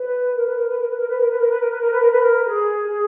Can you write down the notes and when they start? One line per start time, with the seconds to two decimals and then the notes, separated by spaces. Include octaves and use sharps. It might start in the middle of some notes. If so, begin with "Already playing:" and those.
Already playing: B4
0.36 A#4
0.45 B4
0.56 A#4
0.67 B4
0.77 A#4
0.87 B4
0.97 A#4
1.07 B4
1.18 A#4
1.29 B4
1.38 A#4
1.49 B4
1.60 A#4
1.70 B4
1.80 A#4
1.90 B4
2.00 A#4
2.11 B4
2.21 A#4
2.46 G#4
2.89 G#4